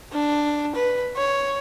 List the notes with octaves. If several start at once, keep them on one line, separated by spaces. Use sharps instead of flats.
D4
B4
C#5